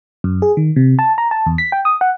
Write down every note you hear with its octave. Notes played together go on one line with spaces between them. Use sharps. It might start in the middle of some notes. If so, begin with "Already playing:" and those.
F#2
G#4
D#3
C3
A5
A#5
A5
E2
B6
G5
D#6
F#5